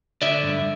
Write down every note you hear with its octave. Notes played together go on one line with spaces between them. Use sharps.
D3 D5 E5
G2